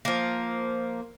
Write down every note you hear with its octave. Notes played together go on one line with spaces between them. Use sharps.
F3 A#3